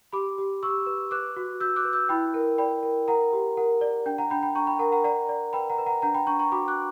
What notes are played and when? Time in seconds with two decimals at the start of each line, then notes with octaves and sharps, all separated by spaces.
0.13 G4 B5 D6
0.38 G4
0.63 G4 C#6 E6
0.87 B4
1.11 B4 D6 F#6
1.37 F#4
1.60 F#4 E6 G6
1.76 D6 F#6
1.85 B4
1.93 E6 G6
2.09 E4 G5 B5
2.34 A#4
2.58 D5 G5 B5
2.83 A#4
3.08 A#4 F#5 A#5
3.33 G4
3.57 A#4 F#5
3.81 D5
4.06 D4 G5
4.18 F#5 A#5
4.30 D4 G5 B5
4.43 G5 B5
4.55 D4 A#5 C#6
4.67 G5 B5
4.79 A#4 F#5 A#5
4.92 F#5 A#5
5.04 D5 F#5 A#5
5.29 D5
5.53 B4 G5 B5
5.70 F#5 A#5
5.78 B4
5.86 F#5 A#5
6.02 D4 F#5 A#5
6.15 G5 B5
6.27 D4 A#5 C#6
6.39 A#5 C#6
6.52 F#4 B5 D6
6.68 D6 F#6